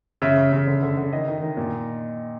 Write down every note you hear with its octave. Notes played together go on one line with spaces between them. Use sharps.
C#3 E5
C#3
C#3
D3
D3
D3
D#3 D#5
D#3
D#3
A#2